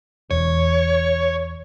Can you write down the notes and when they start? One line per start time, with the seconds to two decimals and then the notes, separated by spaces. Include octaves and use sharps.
0.31 E1 E2 C#5